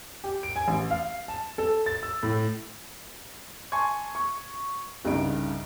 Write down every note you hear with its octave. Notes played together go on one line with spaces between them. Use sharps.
G4
D7
G#5
A1
F5
A5
A4
A6
E6
A2
G#5 A5 C6 C#6 G#6
C#6
C2 G2 C#3 G3 D#4 D7